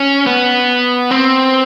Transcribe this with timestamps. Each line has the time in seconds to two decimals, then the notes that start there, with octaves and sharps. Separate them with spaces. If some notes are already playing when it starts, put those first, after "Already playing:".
Already playing: C#4
0.27 B3
1.11 C4